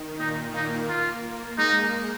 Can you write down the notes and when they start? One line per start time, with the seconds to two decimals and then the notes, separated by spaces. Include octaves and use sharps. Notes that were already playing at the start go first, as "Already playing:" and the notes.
Already playing: D#3
0.19 A#2 D#4
0.54 A#3 D#4
0.88 F4
1.58 G#3 D#4